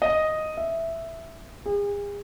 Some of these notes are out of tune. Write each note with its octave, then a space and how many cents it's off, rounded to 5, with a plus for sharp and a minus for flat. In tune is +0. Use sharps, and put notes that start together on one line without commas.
D#5 +0
E5 +0
G#4 -40